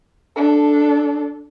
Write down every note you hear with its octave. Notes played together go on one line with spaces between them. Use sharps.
D4 A4